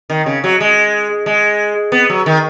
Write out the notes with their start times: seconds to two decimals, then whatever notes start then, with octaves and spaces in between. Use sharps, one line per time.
0.10 D#3
0.26 C#3
0.44 F#3
0.60 G#3
1.26 G#3
1.92 B3
2.10 F#3
2.26 D#3